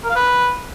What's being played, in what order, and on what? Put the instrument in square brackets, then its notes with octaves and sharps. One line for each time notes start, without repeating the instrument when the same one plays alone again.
[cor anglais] A#4
F5
B4